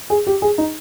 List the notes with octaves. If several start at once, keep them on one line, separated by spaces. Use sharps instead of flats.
G#4
G4
G#4
D#4